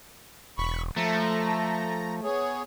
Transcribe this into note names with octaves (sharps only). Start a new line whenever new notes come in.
E1 B5 C#6
F3 A3 A#5
B3 G#4 C#5